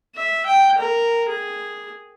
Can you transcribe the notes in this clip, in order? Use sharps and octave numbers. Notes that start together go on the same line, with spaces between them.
E5
G5
A#4
G#4